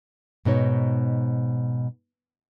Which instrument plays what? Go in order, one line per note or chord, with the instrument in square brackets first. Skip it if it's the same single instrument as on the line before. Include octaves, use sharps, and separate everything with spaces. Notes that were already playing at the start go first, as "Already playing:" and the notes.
[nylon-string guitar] G#2 B2 D#4 C#5